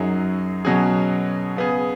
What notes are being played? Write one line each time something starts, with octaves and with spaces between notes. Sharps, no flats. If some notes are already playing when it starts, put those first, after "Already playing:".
Already playing: F#2 F#3 D#4 G#4
B2 F#3 C#4 G#4
C#3 B3 G#4